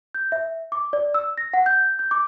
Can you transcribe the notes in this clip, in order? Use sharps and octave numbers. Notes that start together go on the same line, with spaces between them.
G6
E5
D6
D5
E6
A#6
F#5
G6
G6
D6